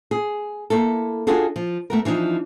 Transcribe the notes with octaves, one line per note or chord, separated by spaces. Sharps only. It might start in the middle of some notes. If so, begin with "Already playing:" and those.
G#4
A#3 E4 A4
D4 F4 F#4 G#4 A4
F3
A3 B3 A#4
E3 F3 D4 D#4